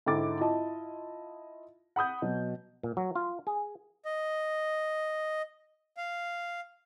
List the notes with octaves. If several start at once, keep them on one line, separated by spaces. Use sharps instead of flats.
G#2 D3 E4 G5 D6 A6
E4 F4 D#5 A5
F#5 B5 D#6 G6
B2 F#3
A#2
F#3
F4
G#4
D#5
F5